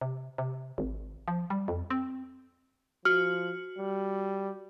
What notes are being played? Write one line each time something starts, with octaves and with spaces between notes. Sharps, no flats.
C3
C3
G#1
F3
G3
F2
C4
F3 F#4 F6
G3